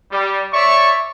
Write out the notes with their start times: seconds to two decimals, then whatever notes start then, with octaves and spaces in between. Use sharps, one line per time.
0.12 G3
0.53 C#5 D5 E5 C#6